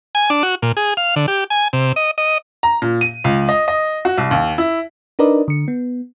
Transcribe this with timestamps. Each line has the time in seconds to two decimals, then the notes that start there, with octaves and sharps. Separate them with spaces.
0.15 G#5
0.30 D4
0.43 F#4
0.62 A#2
0.77 G#4
0.97 F5
1.16 D3
1.28 G4
1.50 G#5
1.73 C3
1.96 D#5
2.18 D#5
2.63 A#5
2.82 A#2
3.01 D#7
3.24 C#2
3.49 D#5
3.68 D#5
4.05 F#4
4.18 C2
4.31 D#2
4.58 E4
5.19 D4 D#4 A#4 B4 D5 D#5
5.48 D3 C#7
5.68 B3